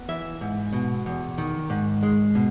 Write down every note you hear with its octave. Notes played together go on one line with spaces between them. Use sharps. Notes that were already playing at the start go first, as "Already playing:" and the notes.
Already playing: B3
E3 E5
G#2
B2
E2
D#3
G#2
G#3
B2